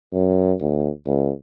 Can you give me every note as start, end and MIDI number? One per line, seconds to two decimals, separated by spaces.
0.13 0.54 42
0.60 0.89 38
1.06 1.31 37